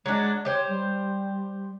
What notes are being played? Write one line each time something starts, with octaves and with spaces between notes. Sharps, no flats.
F#3 G#3 D4
G4 C5 C#5
G3